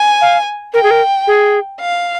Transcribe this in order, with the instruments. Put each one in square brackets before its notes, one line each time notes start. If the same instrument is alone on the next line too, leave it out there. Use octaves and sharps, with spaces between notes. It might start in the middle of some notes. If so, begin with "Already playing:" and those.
Already playing: [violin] G#5
[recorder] F5
[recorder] A#4 [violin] G5
[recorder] G#4
A#4
G#4
[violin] F5